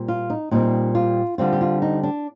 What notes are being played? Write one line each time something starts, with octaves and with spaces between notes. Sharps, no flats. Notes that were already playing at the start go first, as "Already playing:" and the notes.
Already playing: A#2 G3 C4
F4
D#4
A#2 G3 C4 D#4
F4
D3 G3 C4 F4
G4
F4
D#4
D4